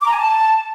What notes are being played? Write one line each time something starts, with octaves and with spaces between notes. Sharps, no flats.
D6
A#5
G#5
A5